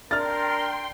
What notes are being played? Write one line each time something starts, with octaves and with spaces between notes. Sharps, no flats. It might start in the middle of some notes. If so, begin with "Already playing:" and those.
D4 A#4 G5 C6 F6 A6